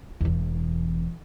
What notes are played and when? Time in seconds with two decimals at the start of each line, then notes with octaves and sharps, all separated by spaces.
0.21 E1 E2